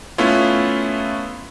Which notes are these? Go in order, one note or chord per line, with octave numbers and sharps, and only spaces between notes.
A3 B3 C#4 E4 F4